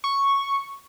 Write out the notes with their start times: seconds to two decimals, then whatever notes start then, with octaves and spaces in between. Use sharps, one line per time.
0.04 C#6